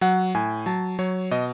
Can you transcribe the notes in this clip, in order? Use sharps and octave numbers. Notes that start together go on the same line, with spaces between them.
F#3 F#5
A2 G#5
F#3 A5
F#3 C#5
B2 D#5